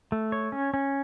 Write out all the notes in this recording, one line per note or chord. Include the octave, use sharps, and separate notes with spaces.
A3
C#5
C#4
C#4